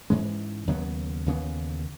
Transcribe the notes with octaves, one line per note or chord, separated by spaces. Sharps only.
G#2 E3 G#3 C#4
D#2 C#3 F#3 B3
D#2 C#3 E3 B3